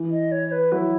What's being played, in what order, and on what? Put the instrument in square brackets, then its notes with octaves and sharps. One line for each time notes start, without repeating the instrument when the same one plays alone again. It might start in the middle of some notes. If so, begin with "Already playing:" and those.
Already playing: [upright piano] E3
[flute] D#5
C#5
B4
[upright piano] F#3 [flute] E4